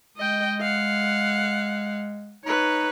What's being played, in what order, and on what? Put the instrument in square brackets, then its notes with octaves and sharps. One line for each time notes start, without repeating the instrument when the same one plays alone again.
[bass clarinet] G#3 [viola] D#5 G5
[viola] F5 F#5
[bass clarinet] D#4 [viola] B4 C#5